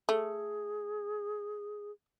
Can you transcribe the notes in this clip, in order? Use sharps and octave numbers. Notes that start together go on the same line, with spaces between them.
A3 G#4